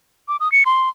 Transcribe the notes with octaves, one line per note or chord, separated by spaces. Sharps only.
D6
D#6
C#7
C6